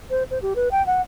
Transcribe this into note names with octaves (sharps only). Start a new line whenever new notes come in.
C5
C5
G4
B4
G5
F#5